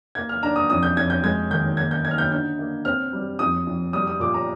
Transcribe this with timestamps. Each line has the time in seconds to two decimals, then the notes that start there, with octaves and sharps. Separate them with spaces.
0.15 A#3 G#6
0.29 F6
0.43 D4 A#5
0.56 D#6
0.70 F2 D#6
0.83 G6
0.97 F2 G#6
1.10 G6
1.24 G#3 G#6
1.51 D#3 G6
1.77 A#3 G#6
1.91 G6
2.05 D#4 G#6
2.11 F6
2.18 G6
2.31 D3 G6
2.59 A#3
2.85 C4 F6
3.13 G3
3.39 F2 D#6
3.67 F2
3.93 G3 D#6
4.07 D#6
4.20 A#2 D6
4.34 A#5